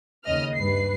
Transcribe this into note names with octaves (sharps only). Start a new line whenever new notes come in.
D#2 C#3 D#5 F6
G2 B4 C7